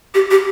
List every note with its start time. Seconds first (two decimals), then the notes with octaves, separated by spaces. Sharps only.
0.14 G4
0.31 G4